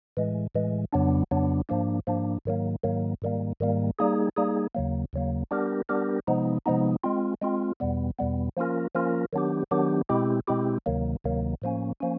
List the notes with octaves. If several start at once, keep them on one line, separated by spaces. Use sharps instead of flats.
A2 E3 G#3
A2 E3 G#3
F2 C#3 F#3 B3 D4
F2 C#3 F#3 B3 D4
G#2 F3 A#3 D4
G#2 F3 A#3 D4
G#2 D#3 F#3 A#3
G#2 D#3 F#3 A#3
G#2 D#3 G3 A#3
G#2 D#3 G3 A#3
G3 A#3 D#4 G#4
G3 A#3 D#4 G#4
D#2 C#3 F#3 A#3
D#2 C#3 F#3 A#3
G3 B3 D4 G4 A#4
G3 B3 D4 G4 A#4
C3 F3 G#3 B3 D#4
C3 F3 G#3 B3 D#4
G#3 C4 F4
G#3 C4 F4
E2 B2 G3 B3
E2 B2 G3 B3
F3 A#3 C#4 F4 A#4
F3 A#3 C#4 F4 A#4
D#3 F#3 B3 D4 G4
D#3 F#3 B3 D4 G4
B2 G#3 C4 E4 G4
B2 G#3 C4 E4 G4
D2 C3 D#3 F#3 A#3
D2 C3 D#3 F#3 A#3
A2 F3 A#3 C#4
F3 A#3 C#4